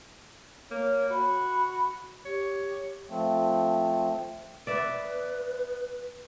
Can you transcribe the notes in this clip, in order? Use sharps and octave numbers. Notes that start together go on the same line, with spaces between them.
A#3 C#5
F#4 B5
G4 C#5
F3 A3 C4
B4 D5 E5